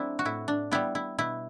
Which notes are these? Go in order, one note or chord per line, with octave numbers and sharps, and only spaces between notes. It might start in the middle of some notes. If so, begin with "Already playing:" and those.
Already playing: F#3 A3 C4 D4 E4
F#4
A2 E4
D4
G3 B3 E4
E4
B2 E4